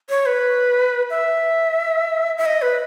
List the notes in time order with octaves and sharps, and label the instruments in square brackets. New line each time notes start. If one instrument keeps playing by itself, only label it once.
[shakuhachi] C#5
B4
E5
E5
D#5
B4